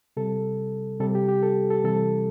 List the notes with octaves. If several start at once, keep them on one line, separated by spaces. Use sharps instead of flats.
C3 G3 A4
C3 G3 A4
G4
G4
A4
A4
C3 E3 G3 A4